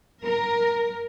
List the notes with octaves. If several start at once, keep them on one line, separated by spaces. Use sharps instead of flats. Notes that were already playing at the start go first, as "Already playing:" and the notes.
A#4